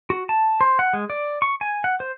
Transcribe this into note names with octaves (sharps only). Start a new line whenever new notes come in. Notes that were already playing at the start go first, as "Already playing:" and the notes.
F#4
A5
C5
F#5
G#3
D5
C#6
G#5
F#5
C5